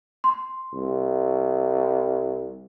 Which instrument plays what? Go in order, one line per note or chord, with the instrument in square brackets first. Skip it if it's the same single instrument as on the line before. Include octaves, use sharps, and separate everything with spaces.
[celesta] C6
[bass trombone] C2